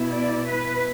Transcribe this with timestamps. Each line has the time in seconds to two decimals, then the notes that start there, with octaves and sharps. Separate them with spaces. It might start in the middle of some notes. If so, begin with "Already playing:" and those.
Already playing: B2 B3 E4
0.09 D5
0.46 B4